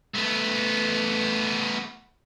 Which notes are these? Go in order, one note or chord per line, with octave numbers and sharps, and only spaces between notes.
A3 B3